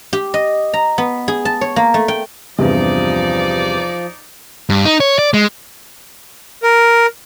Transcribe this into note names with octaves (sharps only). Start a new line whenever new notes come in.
G4
D#5
A#5
B3
G#4
A5
C#5
A#3
A3
G5
E2 G2 C3 F3 D#4 D5
G2
D#4
C#5
D5
G#3
A#4